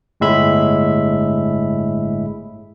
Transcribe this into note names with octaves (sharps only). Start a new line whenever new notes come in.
G1 A2 G#3 E5 B5